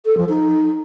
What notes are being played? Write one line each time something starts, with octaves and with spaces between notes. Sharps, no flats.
A4
F3
D#4